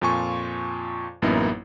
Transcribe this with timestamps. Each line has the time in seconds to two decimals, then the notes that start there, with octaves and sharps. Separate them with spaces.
0.01 F2 A#2 F4 G#5 C#6
1.22 A1 F#2 A#3 B3 D#4 E4